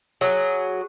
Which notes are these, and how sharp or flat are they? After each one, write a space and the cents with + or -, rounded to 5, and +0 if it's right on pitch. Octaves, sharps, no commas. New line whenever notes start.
F#3 +0 G#4 +0